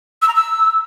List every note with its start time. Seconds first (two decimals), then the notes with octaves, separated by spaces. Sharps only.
0.22 E6
0.28 A#5
0.34 E6